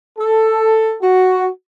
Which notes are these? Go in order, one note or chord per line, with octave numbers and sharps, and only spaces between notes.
A4
F#4